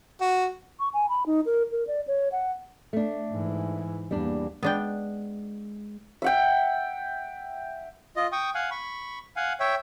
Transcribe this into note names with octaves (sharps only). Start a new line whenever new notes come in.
F#4
C#6
G#5
B5
D#4
A#4
A#4
D5
C#5
F#5
A3 D4
G#2 E3
E2 G3 A#3 D4
G#3 B3 D4 G5
E5 F#5 G5
F4 D#5
G5 C#6 D#6
F5 F#5 G#5
B5 C#6
F5 F#5 G#5
C#5 E5 G5